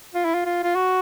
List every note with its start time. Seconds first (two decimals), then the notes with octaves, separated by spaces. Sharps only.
0.15 F4
0.25 E4
0.34 F4
0.45 F4
0.63 F4
0.75 F#4